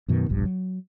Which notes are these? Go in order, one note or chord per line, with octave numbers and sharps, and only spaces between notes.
F#2 B2 D#3
E1 A#1 G2
F#3